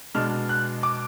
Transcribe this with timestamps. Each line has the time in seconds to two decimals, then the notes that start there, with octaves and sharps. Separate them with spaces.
0.15 B2 G#3 D4 F6
0.49 F#6
0.83 D6